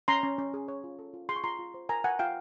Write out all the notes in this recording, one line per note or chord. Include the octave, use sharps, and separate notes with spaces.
C#4 A#5 C6
C#4
C#4
G#4
C#5
F4
A4
F4
G#4 C6
C#6
F4 A#5 C6
F4
C5
A#4 G#5 A#5
A#4 F#5 G#5
F4 F5 G5